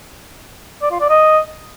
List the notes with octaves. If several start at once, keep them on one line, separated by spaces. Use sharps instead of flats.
D5
F4
D5
D#5